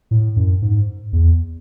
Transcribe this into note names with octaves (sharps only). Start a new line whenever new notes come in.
A2
F#2
G#2
E2